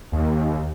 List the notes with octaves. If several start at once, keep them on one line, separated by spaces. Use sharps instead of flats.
D#2